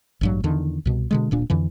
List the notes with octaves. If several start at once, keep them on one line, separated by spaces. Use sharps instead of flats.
A1 G2 F#3
E2 D3 D#3
C2 B2
B2 D3 G#3
D1 A#2 D4
F2 D3 E3